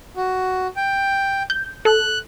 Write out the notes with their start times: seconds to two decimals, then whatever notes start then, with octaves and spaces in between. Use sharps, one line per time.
0.17 F#4
0.76 G5
1.50 G6
1.85 A4 F#6